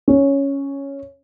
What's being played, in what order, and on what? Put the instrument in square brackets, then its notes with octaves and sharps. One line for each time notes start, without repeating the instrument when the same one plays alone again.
[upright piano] C#4